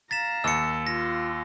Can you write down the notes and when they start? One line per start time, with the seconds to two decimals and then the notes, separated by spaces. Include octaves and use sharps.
0.11 F5 A#5 A6 B6 E7
0.44 D#2 E6 C#7
0.87 F4 A#6